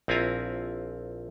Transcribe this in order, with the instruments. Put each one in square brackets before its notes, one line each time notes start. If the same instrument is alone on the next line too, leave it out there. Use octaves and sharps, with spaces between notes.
[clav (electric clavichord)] A#1 C4 E4 F4 G#5 A#5